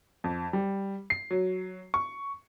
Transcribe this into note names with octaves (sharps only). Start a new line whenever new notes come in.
F2
G3
C7
F#3
C#6